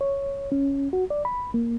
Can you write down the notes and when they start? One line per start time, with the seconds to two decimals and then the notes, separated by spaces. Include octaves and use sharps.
0.01 C#5
0.52 C#4
0.93 F#4
1.10 D5
1.25 B5
1.54 A#3